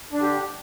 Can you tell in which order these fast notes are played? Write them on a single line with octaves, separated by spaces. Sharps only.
D4 D3 G4